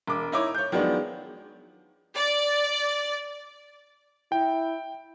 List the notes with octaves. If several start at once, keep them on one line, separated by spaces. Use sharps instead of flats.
E1 D6
D#4 E4 C#5 D6
C#5 G6
D#3 F3 F#3 G#3 B3 D4
D5
E4 G5